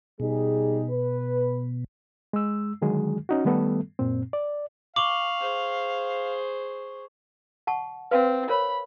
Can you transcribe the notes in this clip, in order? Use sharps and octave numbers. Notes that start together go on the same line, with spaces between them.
B2 G3 D#4 G#4
B4
G#3 E6
D3 D#3 F#3 G#3 G#4
C#4 D#4 F#4
D#3 G3 A3 B3 A4
F#2 A#2 C4
D5
F5 C#6 D6 F7 F#7
G#4 C5
F#5 A5 C#6
C4 B4 F5 C6
A#4 C5 C#5 B5